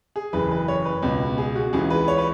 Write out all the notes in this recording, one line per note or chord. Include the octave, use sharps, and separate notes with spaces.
G#4
F#1 F#2 E3 B4
B4
C#5
B4
C#2 B2
G#4
F#4
C#2 C#3 E3 G#4
B4
C#5
B4